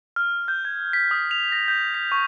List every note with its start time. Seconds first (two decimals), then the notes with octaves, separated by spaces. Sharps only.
0.16 F6
0.48 G6
0.65 G#6
0.93 B6
1.11 D#6
1.31 F7
1.52 A#6
1.68 G6
1.94 B6
2.12 C#6